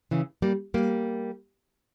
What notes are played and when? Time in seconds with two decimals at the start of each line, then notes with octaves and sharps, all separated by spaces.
0.11 C#3 E3
0.42 G3 A#3
0.74 G3 A#3